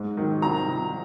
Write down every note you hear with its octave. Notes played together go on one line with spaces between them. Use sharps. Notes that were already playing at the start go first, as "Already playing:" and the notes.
Already playing: G#2
D#3 F#3
C2 A#5
C3 F3